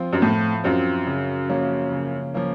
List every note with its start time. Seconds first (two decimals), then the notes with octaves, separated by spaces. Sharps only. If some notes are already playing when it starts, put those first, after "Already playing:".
Already playing: F3 C4 F4
0.13 F#2
0.21 A2 F3
0.64 F#2 C4 F4
1.07 C#3
1.49 F3 A#3 C#4
1.92 C#3
2.34 F3 A#3 C#4